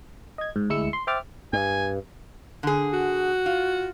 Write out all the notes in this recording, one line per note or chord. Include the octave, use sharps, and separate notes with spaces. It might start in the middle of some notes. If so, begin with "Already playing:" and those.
D#5 G#6
G#2
D2 G#3 E4 E6 C#7
C6
C5 E5 G5 D6 F6 A6
G2 G#5
D3 G#4
F#4
F4